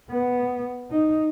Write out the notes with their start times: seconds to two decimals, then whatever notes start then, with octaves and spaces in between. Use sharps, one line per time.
0.11 B3
0.92 D#4